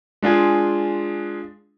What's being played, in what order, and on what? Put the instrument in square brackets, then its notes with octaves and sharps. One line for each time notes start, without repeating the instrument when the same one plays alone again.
[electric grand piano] G#3 D4 F4 G#4